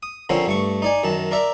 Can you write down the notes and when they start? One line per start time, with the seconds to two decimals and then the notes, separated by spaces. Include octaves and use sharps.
0.03 D#6
0.29 D3 F3 A#3 C4 C#4
0.46 G2 A3 C#6
0.82 D#4 D5 G#5
1.04 F#2 D#3 A5
1.31 A#4 D5 E5 A#5